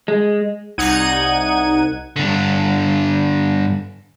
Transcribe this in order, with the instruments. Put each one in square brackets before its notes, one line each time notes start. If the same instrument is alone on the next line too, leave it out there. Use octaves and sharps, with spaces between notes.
[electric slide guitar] G#3
[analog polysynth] C2 D#4 F#5 G#6 D#7
[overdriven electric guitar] G2 D3